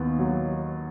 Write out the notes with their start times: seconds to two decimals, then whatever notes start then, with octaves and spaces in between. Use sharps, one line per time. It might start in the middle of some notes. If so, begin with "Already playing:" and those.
Already playing: D#2 D#3 B3
0.19 F#3